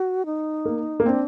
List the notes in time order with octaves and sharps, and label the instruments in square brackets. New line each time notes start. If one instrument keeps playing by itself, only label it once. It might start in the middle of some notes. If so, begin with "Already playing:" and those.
Already playing: [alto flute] F#4
D#4
[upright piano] A#3
A#3
[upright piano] C4 [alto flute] D4